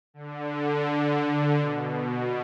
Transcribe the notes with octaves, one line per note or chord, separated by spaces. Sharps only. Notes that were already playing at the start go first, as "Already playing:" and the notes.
D3
D3
D3
B2
B2